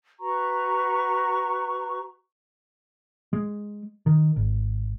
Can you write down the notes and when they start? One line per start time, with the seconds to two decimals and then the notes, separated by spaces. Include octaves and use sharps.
0.20 F#4 B4 A#5 C#6
3.33 G#3
4.06 D#3
4.36 G#1